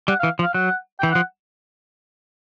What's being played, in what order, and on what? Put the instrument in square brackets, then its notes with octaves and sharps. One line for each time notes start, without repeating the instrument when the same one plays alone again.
[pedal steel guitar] G3 [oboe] F#5
[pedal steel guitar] E3 [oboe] F5
[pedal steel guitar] F3
[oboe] F5
[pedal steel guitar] F#3 [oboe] F#5
[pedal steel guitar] E3 [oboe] G5
[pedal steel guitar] F3 [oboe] F#5